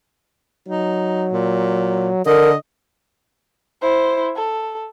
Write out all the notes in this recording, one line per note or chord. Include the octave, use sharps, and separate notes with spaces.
F#3 D#4
A#2
D3 A#4 D#5
E4 C5
A4